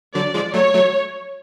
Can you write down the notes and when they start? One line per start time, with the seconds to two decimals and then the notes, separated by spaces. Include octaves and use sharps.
0.15 D3 F#3 D5
0.34 F3 G#3
0.54 F#3 A3 C#5
0.74 F#3 A3